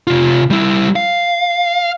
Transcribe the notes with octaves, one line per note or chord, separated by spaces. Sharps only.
C3 F4
G3 E4
F5